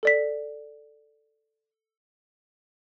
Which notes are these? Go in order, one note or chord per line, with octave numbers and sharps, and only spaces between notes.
A4 D5 B6